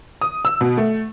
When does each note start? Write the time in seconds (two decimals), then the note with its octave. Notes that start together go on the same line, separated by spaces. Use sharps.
0.21 D#6
0.45 E6
0.61 B2
0.77 A3